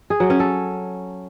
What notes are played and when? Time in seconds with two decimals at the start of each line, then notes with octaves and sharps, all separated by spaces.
0.10 G#4
0.20 F#3
0.30 C#4
0.40 A4